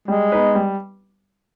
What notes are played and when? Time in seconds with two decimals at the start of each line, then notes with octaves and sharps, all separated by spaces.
0.08 G3 G#3
0.32 B3 D#4 B4
0.55 G3